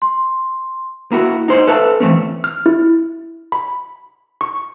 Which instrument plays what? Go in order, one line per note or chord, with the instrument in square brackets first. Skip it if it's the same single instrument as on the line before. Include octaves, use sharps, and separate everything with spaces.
[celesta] C6
[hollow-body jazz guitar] A#3 E4 F#4
D#4 C5 C#5
A4 B4 E5 A5
E3 A3 C4 C#4
[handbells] F6
E4
B5
C#6